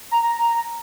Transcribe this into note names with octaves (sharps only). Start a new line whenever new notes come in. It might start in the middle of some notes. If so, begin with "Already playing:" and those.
A#5